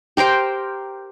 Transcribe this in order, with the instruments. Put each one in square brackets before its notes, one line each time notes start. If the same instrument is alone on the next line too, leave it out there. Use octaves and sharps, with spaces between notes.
[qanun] G4 A#4 C5 G5